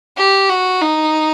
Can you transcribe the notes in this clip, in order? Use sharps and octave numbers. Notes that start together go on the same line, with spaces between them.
G4
F#4
D#4